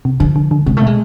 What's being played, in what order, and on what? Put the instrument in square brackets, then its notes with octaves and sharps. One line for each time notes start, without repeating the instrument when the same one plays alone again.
[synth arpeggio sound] C3
[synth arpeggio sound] D3 [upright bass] F3
[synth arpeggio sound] D3
D3
[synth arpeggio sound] C3 [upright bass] G#3
[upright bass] A3
[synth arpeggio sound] B2
[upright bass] G#3